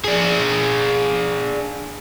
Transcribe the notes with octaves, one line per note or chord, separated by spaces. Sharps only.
D4 G#4